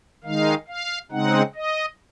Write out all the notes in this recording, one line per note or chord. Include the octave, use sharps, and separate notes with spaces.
D#3 G#3 D#4 F5
F5
C#3 G#3 C4 D#4 F#5
D#5